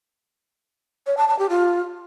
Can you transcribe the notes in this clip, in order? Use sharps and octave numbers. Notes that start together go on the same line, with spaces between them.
C#5
A5
A5
G4
F4